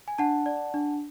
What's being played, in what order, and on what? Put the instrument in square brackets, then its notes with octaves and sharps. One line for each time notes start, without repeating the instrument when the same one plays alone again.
[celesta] G#5
D4 F#5 A5
D5
D4